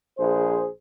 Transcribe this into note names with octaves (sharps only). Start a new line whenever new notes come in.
A#1 G#4 C5